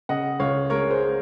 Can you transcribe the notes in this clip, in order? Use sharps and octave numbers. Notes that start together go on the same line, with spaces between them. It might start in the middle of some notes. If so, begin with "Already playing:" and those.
C#3 D#5 F#5
C#2 C#5 F5
G#3 A#4 C#5
G#4 C5